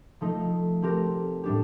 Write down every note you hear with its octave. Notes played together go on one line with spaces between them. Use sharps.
F3 A3 D#4
A3 C4 G4 A#4
A2 G3 D4 G4